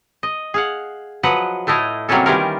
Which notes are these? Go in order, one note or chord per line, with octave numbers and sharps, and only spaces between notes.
D#5
G#4 F5 F#5
F3 F#3 B4 D#5 F#5
A2 A3 E4 D#5 F5
C3 F#3 G3 A#3 C#4 A4
D#3 E3 G3 C#4 F4 A#4